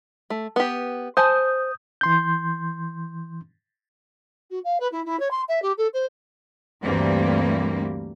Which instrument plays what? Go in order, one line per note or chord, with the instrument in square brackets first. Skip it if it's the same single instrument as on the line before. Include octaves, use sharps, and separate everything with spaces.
[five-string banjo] A3
B3 G4
[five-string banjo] C5 G#5 A5 [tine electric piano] D#6 G6
[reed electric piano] E3 C6 G6
[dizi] F#4
F5
B4
E4
E4
C#5
C6
E5
G4
A4
C5
[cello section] D2 G2 E3 G3 A#3 C4